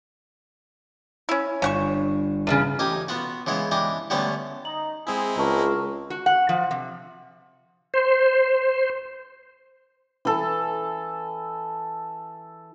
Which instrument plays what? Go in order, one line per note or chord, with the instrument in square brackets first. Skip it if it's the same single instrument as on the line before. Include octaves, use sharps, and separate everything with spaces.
[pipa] C#4 E4
[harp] G1 E7 [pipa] C#4 F#5 C#6
[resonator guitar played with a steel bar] E2 A2 C#3
[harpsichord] A1 D#4 G4 G#5
B3 F4 F#4
C#3 E3 G#3 B3
E3 D4 G4 D#5
D3 G3 A3 B3 C#4 G4
[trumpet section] D#4 [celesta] F#7
[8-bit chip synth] G#3 C4 E4 [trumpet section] G#4
[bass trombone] C#2 [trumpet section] A#4 [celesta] D#5 A5 C#6
[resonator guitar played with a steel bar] F#4
F#5
F3
C3
[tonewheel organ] C5
[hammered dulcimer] E3 A4